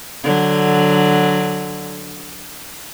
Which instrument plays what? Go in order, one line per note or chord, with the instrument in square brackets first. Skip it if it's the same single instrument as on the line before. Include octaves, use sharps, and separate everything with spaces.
[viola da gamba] D3 F#3